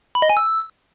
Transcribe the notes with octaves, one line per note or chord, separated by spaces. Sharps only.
B5
D#5
G#5
E6